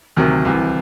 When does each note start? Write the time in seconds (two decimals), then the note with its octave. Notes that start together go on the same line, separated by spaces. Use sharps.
0.16 D2 C3 D#3 F#3
0.45 C2 C3 E3